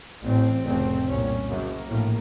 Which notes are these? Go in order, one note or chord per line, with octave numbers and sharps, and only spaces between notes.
A1 A2 C4
F1 F2 C#3 C4
C2 A#2 C#4
F#1 F#2 C#3 A#3
A#1 A2 A#3